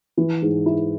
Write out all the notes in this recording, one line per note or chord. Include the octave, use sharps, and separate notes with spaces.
E3
G#2
E4